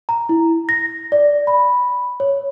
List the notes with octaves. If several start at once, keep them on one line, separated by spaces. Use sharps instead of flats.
A#5
E4
A#6
D5
B5
C#5